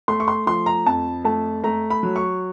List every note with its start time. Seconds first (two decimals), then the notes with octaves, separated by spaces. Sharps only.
0.08 A3 C6
0.20 C#6
0.28 C6
0.47 F3 C6
0.66 A#5
0.86 F2 A5
1.24 A3 A5
1.64 A3 A#5
1.90 B5
2.03 F#3
2.16 C#6